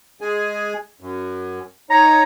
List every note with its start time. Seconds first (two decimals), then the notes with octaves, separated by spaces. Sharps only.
0.21 G#3 G#4 G#5
1.00 F#2
1.90 D#4 C#5 A#5